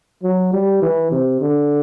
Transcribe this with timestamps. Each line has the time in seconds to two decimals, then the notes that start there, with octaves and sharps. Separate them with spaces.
0.23 F#3
0.53 G3
0.82 E3
1.12 C3
1.41 D3